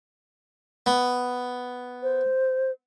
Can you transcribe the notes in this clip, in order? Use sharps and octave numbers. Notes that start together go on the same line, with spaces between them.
B3
C5